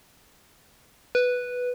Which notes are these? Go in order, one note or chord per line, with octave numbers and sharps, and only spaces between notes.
B4